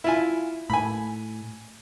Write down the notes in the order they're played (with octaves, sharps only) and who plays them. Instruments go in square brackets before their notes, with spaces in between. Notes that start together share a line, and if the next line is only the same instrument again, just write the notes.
[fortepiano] E4 F4 G#5
[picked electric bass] A2 [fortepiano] G#5 B5